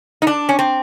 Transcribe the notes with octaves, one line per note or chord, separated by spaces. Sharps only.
D#4
D4
C#4
C4